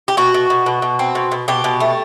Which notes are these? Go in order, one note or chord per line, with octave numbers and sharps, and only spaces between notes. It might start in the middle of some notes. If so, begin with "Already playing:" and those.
G4
B2 F#4
B2
B2
B2
B2
C4
B2
B2
B2 G4
B2
A3